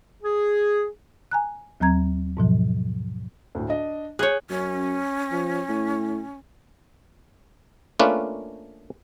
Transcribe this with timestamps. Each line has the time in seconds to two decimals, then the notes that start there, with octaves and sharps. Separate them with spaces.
0.23 G#4
1.31 G#5 A#5 F#6
1.80 D#2 F#3 C4 A#5 G#6
2.37 G#2 B2 F3 F#3
3.55 D2 A2
3.68 D4 D#5
4.19 G#4 C#5 F#6 G6
4.50 F#2 C#4
5.32 F3
5.69 A2
7.99 A3 A#3 C#4 D4 F4 B4